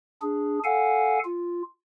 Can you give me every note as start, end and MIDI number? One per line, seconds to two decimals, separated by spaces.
0.22 0.59 62
0.22 0.59 68
0.64 1.19 69
0.64 1.19 77
0.64 1.19 78
0.64 1.19 80
1.25 1.62 65